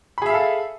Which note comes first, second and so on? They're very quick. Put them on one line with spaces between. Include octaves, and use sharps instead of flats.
B5 G#4 E5 F5 A4